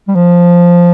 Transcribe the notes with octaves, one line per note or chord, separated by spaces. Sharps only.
G3
F3